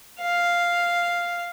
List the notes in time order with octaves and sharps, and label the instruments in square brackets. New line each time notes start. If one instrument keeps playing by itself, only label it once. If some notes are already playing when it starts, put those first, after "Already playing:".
[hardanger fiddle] F5